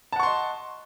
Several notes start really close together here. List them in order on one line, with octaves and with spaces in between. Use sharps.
A5 F#5 C#6 C6 D#5